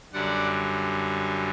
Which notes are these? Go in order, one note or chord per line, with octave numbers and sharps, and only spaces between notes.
F#2 D3 G3 D5 F#5